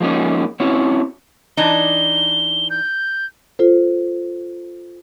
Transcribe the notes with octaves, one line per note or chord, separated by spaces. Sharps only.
F3 G#3 A#3 C#4 D#4
C4 C#4 E4 F#4 C#5
E3 D4 D#4 G7
G6
F4 A4 C5